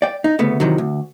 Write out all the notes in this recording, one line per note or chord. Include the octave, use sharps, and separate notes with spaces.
D5 G5
D#4
D2 C#3 A3 B3
C3 D#3 E3 F#3
D2